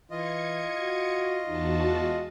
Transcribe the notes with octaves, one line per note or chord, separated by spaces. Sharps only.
E3 F4 D#5 G#6 C#7
F#4
E2 D#4 F#4 A5
G#3